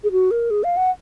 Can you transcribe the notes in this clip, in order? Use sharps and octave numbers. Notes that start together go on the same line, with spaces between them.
G#4
F#4
A#4
G#4
F5
F#5